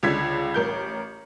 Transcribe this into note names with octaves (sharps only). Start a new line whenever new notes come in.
C#2 D3 F4 G#6 B6
A1 A#4 G6